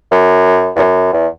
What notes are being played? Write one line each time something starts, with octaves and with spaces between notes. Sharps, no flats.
F#2
E2
F#2
E2